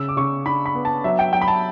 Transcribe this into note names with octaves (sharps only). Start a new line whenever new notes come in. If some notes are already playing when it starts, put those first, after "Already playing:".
Already playing: C#3 E6
D6
C#3 C#6
D4 B5
B5
B3
A5
F#3 E5
G5
F#3 G5
B5
A5